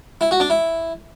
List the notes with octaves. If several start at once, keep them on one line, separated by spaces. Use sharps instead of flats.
E4
F#4
D4
E4